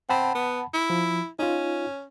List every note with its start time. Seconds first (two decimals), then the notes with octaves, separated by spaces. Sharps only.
0.09 C4 F#5 A5 B5
0.35 B3
0.73 E4
0.90 F3
1.39 C#4 D#4 F4